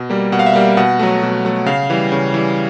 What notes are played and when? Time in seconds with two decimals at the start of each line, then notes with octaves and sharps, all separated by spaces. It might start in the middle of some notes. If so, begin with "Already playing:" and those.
Already playing: B2
0.10 G3 A#3
0.32 B2 F#5
0.39 F5
0.46 E5
0.54 G3 A#3 F5
0.77 B2 F#5
0.99 F#3 A3
1.23 B2
1.45 F#3 A3
1.66 C#3 F5
1.90 E3 G3
2.12 C#3
2.34 E3 G3